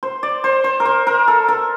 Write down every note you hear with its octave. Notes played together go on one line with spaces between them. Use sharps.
C5
D5
C5
C5
A#4
C5
A#4
A4
A#4